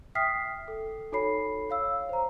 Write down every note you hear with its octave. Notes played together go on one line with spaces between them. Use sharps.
E5 G5 D#6 F6 B6 C7
A4
D#4 F#4 A4 C#5 B5 C7
C#5 F5 E6
C5 A#5